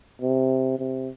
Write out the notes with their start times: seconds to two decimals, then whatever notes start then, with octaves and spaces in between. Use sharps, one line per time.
0.22 C3
0.79 C3